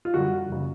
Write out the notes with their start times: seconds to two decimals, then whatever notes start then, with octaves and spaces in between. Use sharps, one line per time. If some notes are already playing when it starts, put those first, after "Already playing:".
0.05 F4
0.14 F#2 D3 G3 F#4
0.49 F#1 C#3